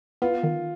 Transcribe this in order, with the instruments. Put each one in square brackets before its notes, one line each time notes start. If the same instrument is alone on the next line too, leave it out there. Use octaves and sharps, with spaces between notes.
[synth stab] B3 [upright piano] F4
[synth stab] D#3